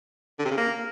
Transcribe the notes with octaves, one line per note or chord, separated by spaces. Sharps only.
D3
C3
C#3
A#3